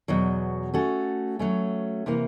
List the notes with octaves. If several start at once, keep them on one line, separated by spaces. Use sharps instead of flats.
E2 B2 F#3
A3 C#4 F#4 A4
F#3 A3 C#4
C3 E3 G3 A#3